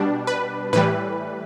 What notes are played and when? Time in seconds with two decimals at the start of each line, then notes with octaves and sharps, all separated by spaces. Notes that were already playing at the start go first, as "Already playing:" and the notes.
Already playing: B2 G3 D4
0.27 B4
0.73 A2 E3 G3 B4